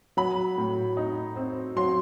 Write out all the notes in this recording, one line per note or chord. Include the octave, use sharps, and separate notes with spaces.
F#3 B5
A2
D#4
C4
F#3 C6